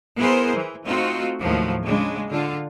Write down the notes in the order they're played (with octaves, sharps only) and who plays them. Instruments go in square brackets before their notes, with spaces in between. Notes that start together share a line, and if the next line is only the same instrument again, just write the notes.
[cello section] B3 E4 G#4 A#4 C5
E3
A3 C4 D#4 F4 F#4
D#2 A2 F3 F#3
C#3 G#3 D4
D3 F4